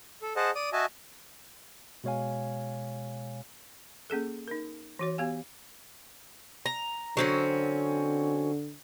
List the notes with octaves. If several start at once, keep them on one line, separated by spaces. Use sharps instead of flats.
A4
G#4 C5 D#5 F#5 A5
D5 D#6
F#4 D#5 E5 G#5 A5
B2 G#3 C#5 F5 G#5
A#3 C#4 G#4 A4
D#4 A#4
E3 F#4 C#5
B3 G4 F5 G#5
A#5
D3 F#3 C4 C#4